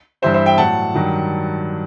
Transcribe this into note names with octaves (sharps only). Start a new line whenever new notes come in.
G2 E3 G3 C5 E5
C5 E5
E5 G5
A2 F#3 F#5 A5
G2 D#3 F#3